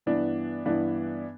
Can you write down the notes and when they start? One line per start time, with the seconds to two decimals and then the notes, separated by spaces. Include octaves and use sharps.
0.06 G2 E3 B3 D4
0.65 G2 E3 B3 D4